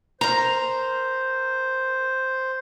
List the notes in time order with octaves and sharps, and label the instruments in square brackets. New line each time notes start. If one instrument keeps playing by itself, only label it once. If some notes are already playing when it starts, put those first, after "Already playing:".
[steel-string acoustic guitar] A#4 A#5 [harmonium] C5